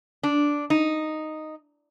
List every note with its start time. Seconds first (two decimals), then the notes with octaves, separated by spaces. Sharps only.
0.23 D4
0.70 D#4